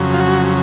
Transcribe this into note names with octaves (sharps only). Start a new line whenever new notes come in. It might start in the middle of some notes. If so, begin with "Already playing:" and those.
Already playing: F2 C#3 F#3
F4
F#4